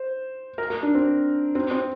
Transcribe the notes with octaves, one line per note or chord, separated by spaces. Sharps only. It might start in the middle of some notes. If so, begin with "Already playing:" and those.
Already playing: C5
A#4
A#4
D4
C4
C4
C4